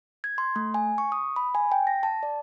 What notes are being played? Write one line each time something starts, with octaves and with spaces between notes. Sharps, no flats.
G#6
C6
A3
G#5
C#6
D#6
B5
G#5
G5
A#6
A5
D5